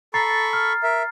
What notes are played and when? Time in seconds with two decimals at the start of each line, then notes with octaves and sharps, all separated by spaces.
0.14 A4 A#5 B5 C#6 A6 C7
0.53 F6
0.83 A#4 E5